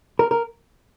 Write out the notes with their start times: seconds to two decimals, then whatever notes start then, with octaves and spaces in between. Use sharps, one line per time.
0.19 A#4
0.31 A#4